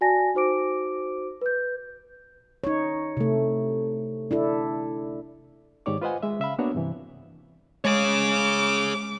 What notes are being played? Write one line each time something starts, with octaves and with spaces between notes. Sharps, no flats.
F#4 D5 G#5 A5 A#6
D#4 F#4 C5 D6 D7
B4 G6
D#4 C#5
C3 A3
D4 E4 A4
G#2 D#3 G4 C#5 D5 D6
F4 B4 C5 D#5 F#5 G#5
G#3 E5
C#3 E5 F5 B5
A#3 B3 D4 F#4 C#5
G2 C3 E3
G#3 G#4 C#5 D6